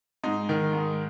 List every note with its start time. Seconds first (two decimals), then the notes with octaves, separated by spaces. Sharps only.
0.24 G#2 D#4
0.49 D#3
0.73 G#2